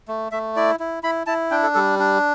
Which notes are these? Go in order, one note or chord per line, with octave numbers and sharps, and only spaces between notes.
A3
A3 E5
E4 D5
E4
E4 B5
E4 A5
D4 G5
A4
G3 A4
D4